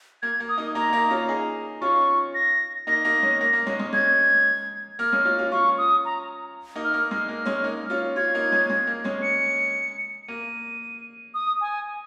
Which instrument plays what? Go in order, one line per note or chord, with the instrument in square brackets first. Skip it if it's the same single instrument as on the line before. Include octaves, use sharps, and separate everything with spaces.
[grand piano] A#3 [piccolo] G#6
[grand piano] A#3
[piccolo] D#6
[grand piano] A#3 D#4
[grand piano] A#3 D#4 [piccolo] A#5
[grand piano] A#3 D#4
C#4 F4
D#4 G#4
[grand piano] C#4 F4 [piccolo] C#6
[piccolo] A#6
[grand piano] A#3 D#4 [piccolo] A#6
[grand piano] A#3 D#4
G#3 C#4
A#3
A#3
G#3 C#4
G#3 C#4
[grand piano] G#3 C#4 [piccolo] G#6
[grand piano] A#3 [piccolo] F6
[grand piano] G#3 C#4
C#4 F4
C#4 F4
[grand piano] C#4 F4 [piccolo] C#6
[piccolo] D#6
A#5
[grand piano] A#3 D#4
[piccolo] F6
[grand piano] A#3
[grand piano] G#3 [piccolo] F6
[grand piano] A#3
G#3 C#4
A#3 D#4
C#4 F4
[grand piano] C#4 F4 [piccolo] G#6
[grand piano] A#3 D#4
G#3 C#4
G#3
A#3
G#3 C#4
[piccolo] C#7
[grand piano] A#3 [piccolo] D#7
[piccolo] D#6
G#5